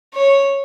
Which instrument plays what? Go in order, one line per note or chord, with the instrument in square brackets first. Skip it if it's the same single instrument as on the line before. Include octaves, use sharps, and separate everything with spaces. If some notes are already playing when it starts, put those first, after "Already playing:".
[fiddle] C#5